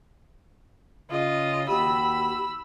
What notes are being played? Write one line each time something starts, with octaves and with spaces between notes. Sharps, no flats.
C#3 F4 D#5
D#2 F#4 G4 B5 E6